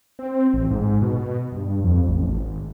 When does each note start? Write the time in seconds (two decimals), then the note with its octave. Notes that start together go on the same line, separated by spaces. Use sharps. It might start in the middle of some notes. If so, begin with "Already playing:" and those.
0.19 C4
0.54 A1
0.71 G#2
1.02 B2
1.52 G2
1.84 F2
2.09 A1
2.29 G#1